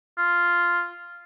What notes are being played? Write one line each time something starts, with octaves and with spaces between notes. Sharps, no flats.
F4